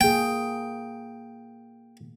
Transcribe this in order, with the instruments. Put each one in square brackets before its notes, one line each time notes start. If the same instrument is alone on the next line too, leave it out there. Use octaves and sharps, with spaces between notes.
[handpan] A#3 G#4 [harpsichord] G5